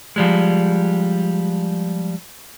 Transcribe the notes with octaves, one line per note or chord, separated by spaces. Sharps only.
F3 G3 G#3